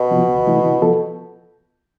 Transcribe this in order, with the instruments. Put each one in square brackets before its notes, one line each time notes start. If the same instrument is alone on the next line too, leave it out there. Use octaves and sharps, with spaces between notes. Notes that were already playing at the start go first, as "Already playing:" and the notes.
Already playing: [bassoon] B2
[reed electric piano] C3 F3 B3 F4
D2
C3 E3 A3 E4
C3
F3 B3 F4 A4